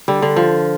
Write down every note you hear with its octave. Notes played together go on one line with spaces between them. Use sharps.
D3 G3
D3
F3